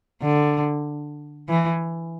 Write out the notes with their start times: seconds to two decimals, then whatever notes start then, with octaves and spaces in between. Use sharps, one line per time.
0.23 D3
1.49 E3